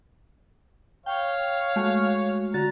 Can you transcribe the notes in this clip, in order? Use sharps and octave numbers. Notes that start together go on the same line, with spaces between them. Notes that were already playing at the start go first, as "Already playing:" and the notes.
C#5 F5 G5
G#3 A3 F#4
D3 F#4 A#5 A6